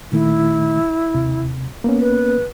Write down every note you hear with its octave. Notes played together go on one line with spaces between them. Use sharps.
A#2 D#3 A3 E4
D#2 C3
A#3 B3 C#4
B4